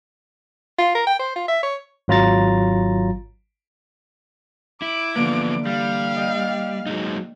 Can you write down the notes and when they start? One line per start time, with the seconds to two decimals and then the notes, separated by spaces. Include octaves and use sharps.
0.78 F4
0.95 A#4
1.07 G5
1.19 C5
1.36 F4
1.48 E5
1.63 C#5
2.08 G#1 F#3 F4 A#5 A6
4.82 E4 D6
5.16 D3 E3 F3 A#3 B3
5.66 G3 F5
6.16 D#5 G5
6.86 F#3 G#3 D#4